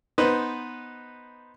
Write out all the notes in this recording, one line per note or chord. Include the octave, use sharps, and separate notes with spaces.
B3 D#4 B4 C5